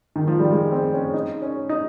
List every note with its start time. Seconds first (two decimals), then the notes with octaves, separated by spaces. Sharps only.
0.16 D#3
0.28 F3
0.39 G3
0.51 G#3
0.72 C4
0.94 C#4
1.14 D#4
1.42 C#4
1.69 D#4